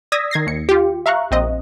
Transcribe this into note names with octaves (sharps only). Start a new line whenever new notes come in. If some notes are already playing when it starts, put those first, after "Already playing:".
D5 D#6 E6 G#6 A#6 B6
D#3 G#6 A#6 C7
D#2 C#7
F4 G4
E5 F5 A#5 C#6 F#6
A#1 C4 D#5